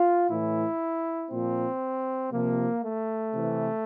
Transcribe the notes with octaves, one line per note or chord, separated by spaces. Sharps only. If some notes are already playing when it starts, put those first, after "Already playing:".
Already playing: F4
A2 E3 E4
A#2 F3 C4
C3 F3 A#3
A3
C3 E3